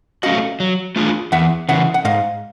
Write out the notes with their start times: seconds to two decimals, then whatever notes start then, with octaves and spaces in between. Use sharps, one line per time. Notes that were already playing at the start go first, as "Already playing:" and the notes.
0.23 A3 C#4 F#4 D#5 F5
0.60 F#3
0.96 A3 D4 F4 G#4
1.32 E2 E5 F#5
1.69 C#3 E3 E5 F#5
1.94 F#5
2.05 G#2 D#5 F5